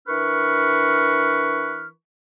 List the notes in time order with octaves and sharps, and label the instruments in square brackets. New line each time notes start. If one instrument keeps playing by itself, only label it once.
[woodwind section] E3 D4 A#4 B4 C#6 F6